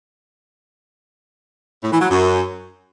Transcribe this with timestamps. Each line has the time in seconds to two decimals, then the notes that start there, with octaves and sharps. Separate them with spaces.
1.83 A2
1.92 E3
2.00 F#3
2.09 F#2